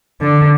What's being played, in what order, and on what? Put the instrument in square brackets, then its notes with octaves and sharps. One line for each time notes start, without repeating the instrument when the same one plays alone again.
[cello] D3